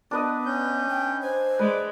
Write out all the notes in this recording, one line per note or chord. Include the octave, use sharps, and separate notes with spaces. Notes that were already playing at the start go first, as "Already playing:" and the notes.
B3 D4 B4 D#5
C#4 G6
G5
C5 G#5
G#3 B4 D5